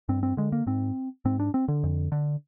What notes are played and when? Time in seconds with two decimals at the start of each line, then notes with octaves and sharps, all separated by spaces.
0.09 G2 C4
0.23 C4
0.37 D3 G#3
0.52 A#3
0.67 G#2 C4
1.25 G#2 C4
1.40 D4
1.54 C4
1.68 D3
1.83 F2
2.12 D3